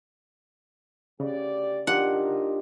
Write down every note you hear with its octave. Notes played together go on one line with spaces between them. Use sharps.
D2 C#3 G4 D5
D4 D#4 F4 G4 A#4 F#5